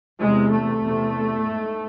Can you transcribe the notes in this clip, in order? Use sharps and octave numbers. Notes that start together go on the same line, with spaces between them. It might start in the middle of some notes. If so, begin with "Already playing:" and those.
E2 C3 G#3
A3
E2 C3
G#2